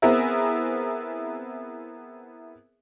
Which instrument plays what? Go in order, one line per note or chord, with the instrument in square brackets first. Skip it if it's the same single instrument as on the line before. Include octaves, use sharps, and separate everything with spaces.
[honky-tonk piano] B3 C4 E4 G#4 A#4 E5